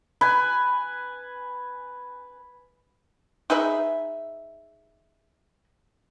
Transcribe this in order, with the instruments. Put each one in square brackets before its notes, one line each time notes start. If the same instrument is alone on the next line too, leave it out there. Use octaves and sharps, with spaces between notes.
[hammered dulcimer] B4 G#5
[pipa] D#4 G#4 B4 E5